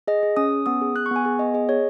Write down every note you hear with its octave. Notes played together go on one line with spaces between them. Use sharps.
G#4 D#5
G#4
C#4 D#6
C#4
B3 D#6
G#4
B3 F#6
C#6
B3 G#5
G#4 G#5
B3 D#5
G#4 D#5
G#4 C#5